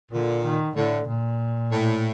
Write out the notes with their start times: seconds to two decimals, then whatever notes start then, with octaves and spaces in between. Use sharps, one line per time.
0.12 A#2 D3
0.43 D#3
0.76 A2 D3
1.08 A#2
1.72 A2